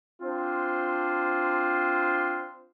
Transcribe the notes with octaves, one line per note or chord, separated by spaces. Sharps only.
C4 D4 F4 C5